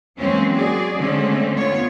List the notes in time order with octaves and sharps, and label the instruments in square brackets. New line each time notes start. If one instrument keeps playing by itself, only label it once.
[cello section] E3 F#3 G#3 A#3 C4 C#4
F#4 G#4 D5
D3 G#3 A3 C4 C#4
B3 F4 C#5